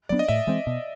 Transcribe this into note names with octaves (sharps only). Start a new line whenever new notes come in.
F#3 B3 D4 D5
D#5
A2 E5
E3 G#3 C4
B2